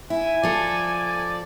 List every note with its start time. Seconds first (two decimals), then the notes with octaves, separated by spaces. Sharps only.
0.10 E4 G#5
0.43 F3 A4 D5